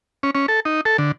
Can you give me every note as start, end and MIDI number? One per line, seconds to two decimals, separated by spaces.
0.23 0.31 61
0.35 0.46 61
0.48 0.60 69
0.65 0.81 63
0.85 0.97 69
0.98 1.12 50